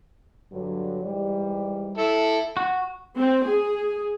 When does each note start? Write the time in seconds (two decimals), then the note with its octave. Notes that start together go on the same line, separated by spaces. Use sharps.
0.52 G2 D3 F#3
1.04 G#2 E3 G3
1.98 E4 A4
2.57 F#4
3.17 C4
3.45 G#4